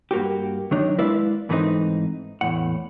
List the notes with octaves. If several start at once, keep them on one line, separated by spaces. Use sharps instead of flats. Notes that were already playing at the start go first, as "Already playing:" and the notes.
G2 A#3 F#4 G4
D#3 F#3 D4 D#4
G#3 E4 B4 D5 E5 F5
G#2 E3 A3 B3 C4 D#4
E2 A2 F#5